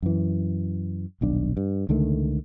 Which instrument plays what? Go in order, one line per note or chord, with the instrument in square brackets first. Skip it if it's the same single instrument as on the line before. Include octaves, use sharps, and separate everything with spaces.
[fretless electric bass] F#2 E3
D#1 B1 D4
G2
C#2 D3 D#3 A3